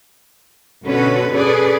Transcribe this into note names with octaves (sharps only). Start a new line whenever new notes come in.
B2 D3 C#4 F#4 A4 B4
C#4 G#4 A4 B4 D5